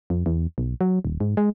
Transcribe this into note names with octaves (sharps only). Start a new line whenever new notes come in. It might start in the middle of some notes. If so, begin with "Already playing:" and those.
F2
E2
B1
F#3
D#1
G#2
G#3